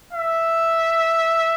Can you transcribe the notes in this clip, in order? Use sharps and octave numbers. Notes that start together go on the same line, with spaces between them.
E5